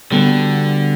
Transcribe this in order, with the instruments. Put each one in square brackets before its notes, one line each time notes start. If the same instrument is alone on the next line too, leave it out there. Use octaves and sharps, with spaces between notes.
[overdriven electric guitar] D3 [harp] G3 B3 D4 F#4